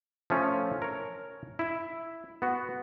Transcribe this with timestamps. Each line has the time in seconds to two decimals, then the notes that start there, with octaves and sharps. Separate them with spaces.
0.30 F3 A3 C#4 F4
0.82 A#4 C#5
1.59 E4 E5
2.42 B3 F#4